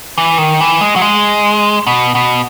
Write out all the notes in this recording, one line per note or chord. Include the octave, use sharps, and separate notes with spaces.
E3
D#3
E3
G#3
F#3
G#3
B2
B2